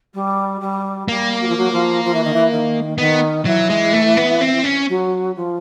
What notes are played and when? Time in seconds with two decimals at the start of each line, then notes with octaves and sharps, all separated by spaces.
0.14 G3
0.60 G3
1.08 G3 A#3
1.41 F#3
1.47 F3
1.56 F#3
1.72 F3
2.04 F3
2.14 E3
2.24 D#3
2.34 E3
2.51 D#3
2.98 D#3 B3
3.45 E3 F#3
3.69 G#3
3.93 A3
4.17 B3
4.41 C4
4.64 C#4
4.88 F#3
5.36 F3